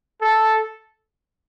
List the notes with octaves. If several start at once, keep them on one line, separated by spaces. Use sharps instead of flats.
A4